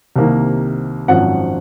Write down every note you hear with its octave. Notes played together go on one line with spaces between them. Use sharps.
C2 C3 D#3 A#3
G#1 F#2 F3 F#5